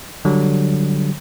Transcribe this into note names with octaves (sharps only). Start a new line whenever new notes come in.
D3 F#3 G3